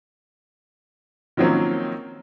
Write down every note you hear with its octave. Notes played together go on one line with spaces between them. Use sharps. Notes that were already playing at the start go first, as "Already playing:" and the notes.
D#3 F3 F#3 A#3 C4 C#4